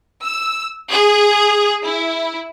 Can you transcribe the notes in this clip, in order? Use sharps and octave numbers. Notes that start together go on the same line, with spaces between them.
E6
G#4
E4